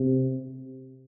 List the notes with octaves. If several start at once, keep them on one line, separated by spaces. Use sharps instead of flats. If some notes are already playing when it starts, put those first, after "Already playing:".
Already playing: C3